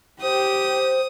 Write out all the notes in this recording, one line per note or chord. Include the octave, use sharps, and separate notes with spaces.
G4 C5 D#6